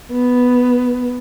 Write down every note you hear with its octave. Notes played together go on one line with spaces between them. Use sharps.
B3